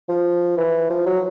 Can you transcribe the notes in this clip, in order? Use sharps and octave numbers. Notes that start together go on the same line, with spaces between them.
F3
E3
F3
F#3